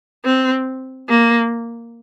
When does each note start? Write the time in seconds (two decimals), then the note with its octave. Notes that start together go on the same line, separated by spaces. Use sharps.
0.25 C4
1.09 A#3